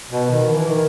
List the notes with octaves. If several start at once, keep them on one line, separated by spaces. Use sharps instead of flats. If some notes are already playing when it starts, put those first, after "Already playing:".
B2
D#3
E3
D#3